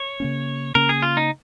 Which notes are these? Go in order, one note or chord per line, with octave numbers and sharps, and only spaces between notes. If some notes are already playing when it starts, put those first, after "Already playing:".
Already playing: C#5
C#3 A#3 C#4
C#3 A#3 C#4 A#4
G#4
F4
D#4